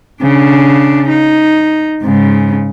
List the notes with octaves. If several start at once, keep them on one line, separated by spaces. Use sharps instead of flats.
C#3 D4
D#4
G#2 C#3